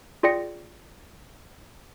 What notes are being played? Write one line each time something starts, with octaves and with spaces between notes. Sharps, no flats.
F4 G#4 D5 G5 A#6 C#7